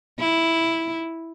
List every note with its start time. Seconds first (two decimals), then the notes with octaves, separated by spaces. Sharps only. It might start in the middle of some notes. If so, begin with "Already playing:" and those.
0.19 E4